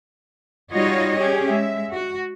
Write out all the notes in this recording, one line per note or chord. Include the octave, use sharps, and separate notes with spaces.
G3 D#4 F4 F#4 C#5 D#5
C#4 G4 G#4
G#3 E5
F#4